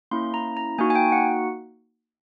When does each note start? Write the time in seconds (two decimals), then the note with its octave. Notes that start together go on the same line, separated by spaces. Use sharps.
0.11 A#3 C#4 E4 C6
0.34 A#5
0.57 A#5
0.78 A#3 D#4 F#4 G#5
0.90 G#5
0.95 G5
1.12 F#5